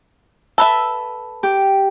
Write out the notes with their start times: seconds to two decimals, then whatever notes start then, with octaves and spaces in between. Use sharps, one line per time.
0.58 A4 B4 E5
1.43 G4